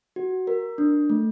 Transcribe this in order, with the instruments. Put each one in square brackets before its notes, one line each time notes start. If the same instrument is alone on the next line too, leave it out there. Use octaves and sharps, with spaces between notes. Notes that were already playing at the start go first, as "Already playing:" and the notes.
[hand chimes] F#4
A#4
D4
A3